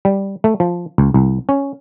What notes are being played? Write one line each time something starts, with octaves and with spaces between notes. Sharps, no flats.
G3
A3
F3
C#2
C2
C#4